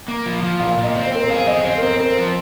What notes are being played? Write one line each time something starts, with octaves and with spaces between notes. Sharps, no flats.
A#3
F3
F3
A#2 F5
A#2
D#5
C4
C5
C4 A#4
C5
G#4 F5
C4 D#5
C4 C5
A#4
C4 C5
C5
C4 A#4
F3